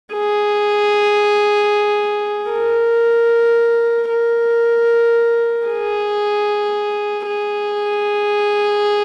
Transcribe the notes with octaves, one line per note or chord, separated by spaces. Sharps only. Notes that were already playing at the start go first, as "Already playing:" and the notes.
G#4
A#4
A#4
G#4
G#4